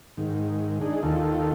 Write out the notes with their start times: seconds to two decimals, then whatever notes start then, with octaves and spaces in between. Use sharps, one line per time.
0.17 G#2 D#3
0.81 D4 D#4 G#4
1.03 D#2 D#3 F4 A4